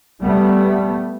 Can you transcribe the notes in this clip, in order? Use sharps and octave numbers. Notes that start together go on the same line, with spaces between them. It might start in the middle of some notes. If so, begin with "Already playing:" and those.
G3 A3 B3